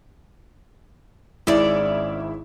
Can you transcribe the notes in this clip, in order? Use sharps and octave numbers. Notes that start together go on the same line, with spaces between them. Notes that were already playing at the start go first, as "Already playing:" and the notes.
G#1 G#2 C#4 E4 G#4 D5